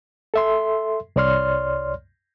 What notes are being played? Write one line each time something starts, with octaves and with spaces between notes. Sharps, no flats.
A4 E5 C6
C2 C#5 D5 C6 F6